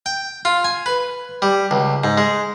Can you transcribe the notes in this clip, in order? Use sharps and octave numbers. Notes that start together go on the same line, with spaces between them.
G5
F4
G#5
B4
G3
C#2
G#2
G#3